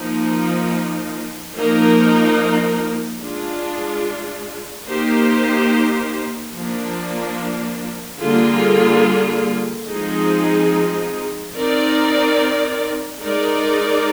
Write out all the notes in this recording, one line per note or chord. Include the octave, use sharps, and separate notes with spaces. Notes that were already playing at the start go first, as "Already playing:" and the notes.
Already playing: F3 A#3 D#4
F3 A#3 D#4 A#4
G#3 D4 F4
A#3 D#4 G4 C5
F3 A#3 D4
D3 G3 A#3 F4 G#4
F3 G#3 C4 D#4 G#4
C4 D#4 A#4 D5
G#3 D#4 A#4 D5